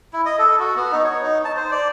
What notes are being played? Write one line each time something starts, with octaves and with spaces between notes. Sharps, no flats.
E4
D#5
A4
F#4
B3
D#4
C#5
D#4
A5
C5
D5